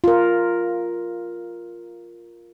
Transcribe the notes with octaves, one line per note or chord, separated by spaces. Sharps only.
F4 A#4